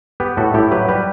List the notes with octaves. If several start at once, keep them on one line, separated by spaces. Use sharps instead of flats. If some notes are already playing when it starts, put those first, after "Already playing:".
B3 G4 B4
A2 F#4 A4
A2 E4 G4
F#3 G4 B4
G3 G4 B4